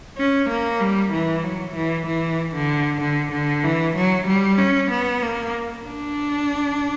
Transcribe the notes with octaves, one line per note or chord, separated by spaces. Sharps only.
C#4
A#3
G3
E3
F#3
E3
E3
D3
D3
D3
E3
F#3
G3
C#4
B3
A#3
D4